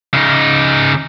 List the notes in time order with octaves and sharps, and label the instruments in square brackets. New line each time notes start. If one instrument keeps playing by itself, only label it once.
[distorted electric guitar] C#3 D#4